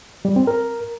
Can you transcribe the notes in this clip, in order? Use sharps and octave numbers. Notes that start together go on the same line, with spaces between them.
G3
C4
A#4